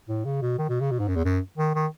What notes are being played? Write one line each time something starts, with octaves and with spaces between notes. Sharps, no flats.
A2
C#3
B2
D#3
B2
C#3
B2
G#2
F#2
E2
F#2
D#3
D#3